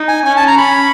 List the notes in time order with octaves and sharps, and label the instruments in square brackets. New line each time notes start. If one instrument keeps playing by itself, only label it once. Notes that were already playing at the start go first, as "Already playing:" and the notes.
Already playing: [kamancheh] D#4
[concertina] G#5
[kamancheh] C#4 [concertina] G#5
[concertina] A5
A#5
[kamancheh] C#4 [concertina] B5